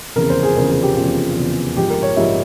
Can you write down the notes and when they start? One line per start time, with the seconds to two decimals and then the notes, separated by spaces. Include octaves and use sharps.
0.16 F1 E2 C#3 A#4
0.30 C5
0.43 G#4
0.56 F1 E2 C#3 A#4
0.69 G#4
0.83 G4
0.96 F1 E2 C#3 F4
1.36 F1 E2 C#3
1.77 A#1 G#2 G3 G4
1.90 A#4
2.03 C#5
2.16 A#1 G#2 G3 E5